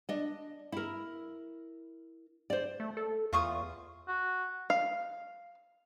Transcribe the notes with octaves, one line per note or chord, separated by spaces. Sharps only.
D4 D#5
E4 A#4
C5 D5
A3
A4
E2 F4 C#6 D#6
F#4
F5